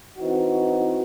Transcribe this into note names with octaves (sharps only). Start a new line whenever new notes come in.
E3 C4 D#4 F#4